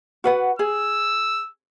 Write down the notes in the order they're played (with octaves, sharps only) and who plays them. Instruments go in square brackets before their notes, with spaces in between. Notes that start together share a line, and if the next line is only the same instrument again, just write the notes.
[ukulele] F#4 B4 F#5
[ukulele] G#4 [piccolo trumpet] E6